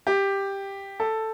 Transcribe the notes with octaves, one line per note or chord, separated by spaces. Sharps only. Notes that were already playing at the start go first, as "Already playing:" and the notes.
G4
A4